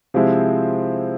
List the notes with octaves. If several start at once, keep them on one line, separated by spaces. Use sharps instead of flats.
C3 F3 G#3 C4 E4